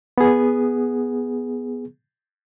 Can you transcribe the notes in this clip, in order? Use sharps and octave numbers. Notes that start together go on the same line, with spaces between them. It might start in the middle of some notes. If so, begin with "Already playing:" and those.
B3 G#4